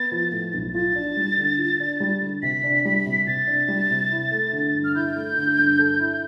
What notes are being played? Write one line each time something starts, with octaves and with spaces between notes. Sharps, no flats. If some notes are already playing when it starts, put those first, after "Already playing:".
Already playing: B3 A6
F3
A2
B1
F4 A6
D4
G3
D3
F4
D4
G3
D3
C3 B6
D4
G3 B6
C3
C3 A6
D4
G3
C3
E4
A3
D3
G2
F6
E4 G6
A3
D3
G2
A4
E4